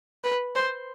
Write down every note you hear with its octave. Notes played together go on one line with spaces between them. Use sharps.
B4
C5